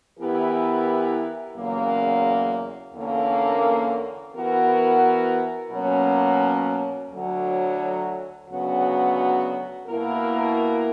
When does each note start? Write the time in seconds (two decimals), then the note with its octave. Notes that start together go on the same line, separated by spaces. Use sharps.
0.18 E3 B3 E4 G4 A#4
1.56 E2 C#3 F#3 A#3
2.95 E2 D3 A#3 C#4
4.34 E3 B3 F#4 A#4
5.72 B2 F#3 A#3 C#4
7.11 D2 D3 F#3
8.49 D2 C#3 F#3 B3 F#4
9.87 B2 A#3 E4 A#4